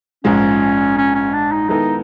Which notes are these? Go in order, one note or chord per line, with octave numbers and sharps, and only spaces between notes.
A#1 G#2 F3 G#3 C#4
C#4
C#4
D4
D#4
D#3 G#3 B3 D#4 E4 A4